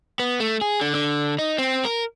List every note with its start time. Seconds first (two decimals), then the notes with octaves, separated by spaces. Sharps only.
0.19 B3
0.40 A3
0.61 G#4
0.81 D3
0.95 D3
1.38 D#4
1.58 C4
1.85 A#4